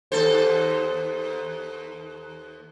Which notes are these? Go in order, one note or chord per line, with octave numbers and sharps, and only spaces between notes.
D#2 A4 C5